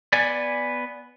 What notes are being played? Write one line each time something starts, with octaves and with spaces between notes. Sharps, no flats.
B3 D5 G#5